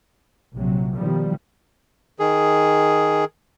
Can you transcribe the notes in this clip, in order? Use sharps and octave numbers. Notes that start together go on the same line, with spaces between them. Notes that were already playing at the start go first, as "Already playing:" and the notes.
A#1 C3 F#3
B2 D#3 F3 G3
D#3 G#4